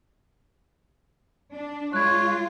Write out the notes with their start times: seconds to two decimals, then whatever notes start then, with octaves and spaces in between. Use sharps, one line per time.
1.54 D4
1.93 G#3 F4 C#5 F#6 G#6